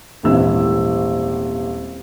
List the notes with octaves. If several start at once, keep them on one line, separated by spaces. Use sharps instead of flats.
D#1 G#1 E3 E6